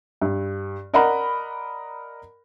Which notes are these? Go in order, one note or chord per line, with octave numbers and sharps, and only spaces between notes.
G2
A#4 D5 D#5 F#5 A#5 B5